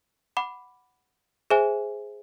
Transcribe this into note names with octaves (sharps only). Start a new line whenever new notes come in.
F#5 B5 D6
G#4 C5 E5 G#5